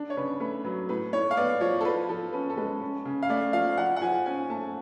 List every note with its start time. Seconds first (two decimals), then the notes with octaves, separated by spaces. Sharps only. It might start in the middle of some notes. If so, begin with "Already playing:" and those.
Already playing: D4
0.10 C#5
0.17 C#3 B4
0.40 A3 B4
0.65 F#3 B4
0.89 A2 B4
1.13 A2 C#5
1.31 F5
1.37 B3 D5
1.61 F3 C#5
1.81 A4
1.85 F3 B4
2.09 F3 A4
2.33 C#4 B4
2.50 A4
2.57 G#3 B4
2.81 C#4
3.05 C#3
3.23 F5
3.29 A3 D5
3.53 F3 F5
3.77 F3 F#5
3.96 F#5
4.02 F3 G#5
4.26 C#4 G#5
4.50 A3 A5